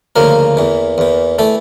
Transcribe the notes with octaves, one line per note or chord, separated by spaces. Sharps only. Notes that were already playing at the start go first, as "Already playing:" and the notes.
D2 C#3 F3 A#3 A#4
E2 E3
E2 E3
E3 A3 A4